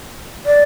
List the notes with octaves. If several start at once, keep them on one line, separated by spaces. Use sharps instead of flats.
D5